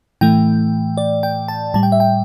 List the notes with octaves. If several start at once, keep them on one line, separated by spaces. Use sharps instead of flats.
A2 E3 A3 G5
D5
G5
A5
A2 G3 A5
G5
E5
G5